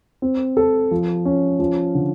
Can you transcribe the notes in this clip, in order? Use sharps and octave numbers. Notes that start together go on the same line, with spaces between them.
C4
A4
F3
C#4
F3
D3